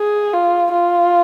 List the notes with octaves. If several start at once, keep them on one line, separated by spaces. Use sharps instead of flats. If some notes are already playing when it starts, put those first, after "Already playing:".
Already playing: G#4
F4
F4